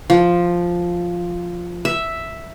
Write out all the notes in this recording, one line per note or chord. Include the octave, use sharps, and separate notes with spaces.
F3
E5